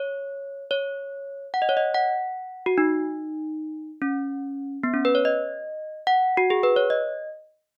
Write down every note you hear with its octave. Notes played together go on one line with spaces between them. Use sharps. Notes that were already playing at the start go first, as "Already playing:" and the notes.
Already playing: C#5
C#5
F#5
D#5
C#5
D#5
F#5
F#4
D#4
C#4
B3
C#4
B4
C#5
D#5
F#5
F#4
G#4
B4
C#5
D#5